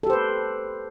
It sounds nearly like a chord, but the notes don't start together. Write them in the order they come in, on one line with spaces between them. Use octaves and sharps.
A4 G4 C5 B4